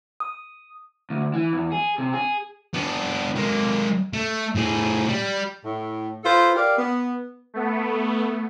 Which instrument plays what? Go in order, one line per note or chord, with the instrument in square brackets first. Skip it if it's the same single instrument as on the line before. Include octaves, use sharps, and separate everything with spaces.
[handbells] D#6
[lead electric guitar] D2
E3
E2
G#4
C3
G#4
[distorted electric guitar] B3 D4
G#3 A#3
A3
A2 G#4
G3
[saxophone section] A2
F4 A4 B4 C5
G4 A#4 D5 F5
B3
[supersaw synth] A3 B3